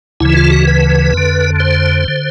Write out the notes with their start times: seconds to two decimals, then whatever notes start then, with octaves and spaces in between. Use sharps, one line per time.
0.20 D2 C#3 E3 E4
0.37 F4
0.51 F#4
0.67 B4
1.14 F2 D3
1.60 C5
2.08 D3